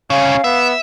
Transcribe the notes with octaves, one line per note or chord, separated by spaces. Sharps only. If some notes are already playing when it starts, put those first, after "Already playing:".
C2 C#3 C#4 F5
B3 E5